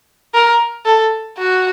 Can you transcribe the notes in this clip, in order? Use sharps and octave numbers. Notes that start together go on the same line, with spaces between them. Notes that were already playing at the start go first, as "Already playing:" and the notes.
A#4
A4
F#4